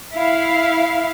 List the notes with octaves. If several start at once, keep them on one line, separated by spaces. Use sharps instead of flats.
E4 F5